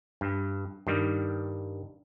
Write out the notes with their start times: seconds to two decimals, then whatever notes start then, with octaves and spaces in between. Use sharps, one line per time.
0.21 G2
0.87 G2 D#3 G3